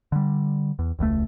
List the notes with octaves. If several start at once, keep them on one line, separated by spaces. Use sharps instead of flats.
D3 G3
E2
E1 C#2 D#3 A3